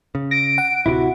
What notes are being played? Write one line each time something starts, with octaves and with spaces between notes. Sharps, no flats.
C#3
A#6 D7
F#5
D1 C3 E4 F#4